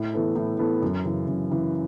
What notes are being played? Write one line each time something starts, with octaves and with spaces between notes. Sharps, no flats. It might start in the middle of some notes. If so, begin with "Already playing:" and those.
Already playing: A2
E3 B3 A4
A2
E3 B3 A4
F#2
C#3 E3
F#2
C#3 E3